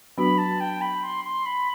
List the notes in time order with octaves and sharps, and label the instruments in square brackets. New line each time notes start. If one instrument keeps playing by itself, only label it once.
[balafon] F#3 B3 D4 F#4 B4 [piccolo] B5
[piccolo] A5
G5
B5
C6
C6
B5